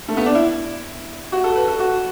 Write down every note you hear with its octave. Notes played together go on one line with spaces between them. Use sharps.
A3
B3
D4
E4
F#4
A4
B4
A4
F#4